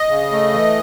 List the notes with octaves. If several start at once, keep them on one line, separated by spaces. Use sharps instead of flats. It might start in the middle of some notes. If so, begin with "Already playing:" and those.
Already playing: D#5
C#3
A3
E3